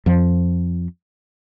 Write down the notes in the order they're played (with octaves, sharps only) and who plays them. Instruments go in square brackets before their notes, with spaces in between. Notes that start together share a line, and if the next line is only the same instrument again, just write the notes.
[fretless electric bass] F2 F3